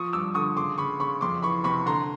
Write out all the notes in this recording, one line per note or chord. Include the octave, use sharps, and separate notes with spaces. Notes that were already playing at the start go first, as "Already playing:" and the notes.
Already playing: F3 C#6 D#6
G2 D6 E6
D3 C#6 D#6
C#3 C6 D6
C#3 B5 C#6
C#3 B5 C#6
F2 C6 D6
E3 B5 C#6
C3 B5 C#6
D3 A#5 C6